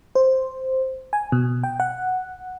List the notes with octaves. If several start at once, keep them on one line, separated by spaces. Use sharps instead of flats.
C5
G#5
B2
G5
F#5